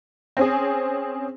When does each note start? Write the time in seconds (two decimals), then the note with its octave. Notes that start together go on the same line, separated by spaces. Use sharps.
0.37 C4 C#4 G#4